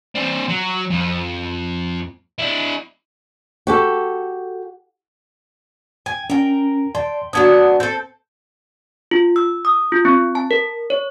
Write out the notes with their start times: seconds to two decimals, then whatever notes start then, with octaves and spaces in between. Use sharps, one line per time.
0.15 C4 D4
0.49 F#3
0.90 F2
2.39 D4 E4
3.67 F#4 G4 A4
6.06 G5 G#5
6.30 C#4 A#4 G5
6.95 D5 G5 A5 C6
7.33 F#3 B3 D4 D#6 G#6
7.80 C4 A4 G6
9.11 F4
9.36 E6
9.65 D#6
9.92 F4
10.05 C4
10.35 A5
10.51 A#4
10.90 C#5